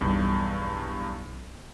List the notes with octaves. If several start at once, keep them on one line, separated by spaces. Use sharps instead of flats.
B1 E2 G2